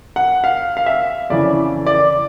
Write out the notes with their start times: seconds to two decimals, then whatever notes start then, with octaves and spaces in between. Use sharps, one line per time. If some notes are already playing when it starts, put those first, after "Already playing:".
0.16 F#5
0.44 F5
0.77 F5
0.86 E5
1.30 F2 C#3 E3 D5
1.86 D5